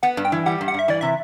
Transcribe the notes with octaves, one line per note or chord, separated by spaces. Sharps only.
B3 F#5
G2
G5
E3
G3 F#5
G2
F#5
G2 E5
E3 D5
C3 E5